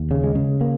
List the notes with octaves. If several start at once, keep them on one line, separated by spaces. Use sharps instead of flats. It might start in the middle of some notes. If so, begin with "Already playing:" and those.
Already playing: D#2
C#3
G#3
C#3
A#3